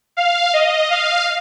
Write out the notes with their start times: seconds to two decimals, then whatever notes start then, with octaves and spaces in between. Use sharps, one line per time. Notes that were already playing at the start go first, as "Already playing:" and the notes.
0.17 F5
0.53 D#5
0.91 F5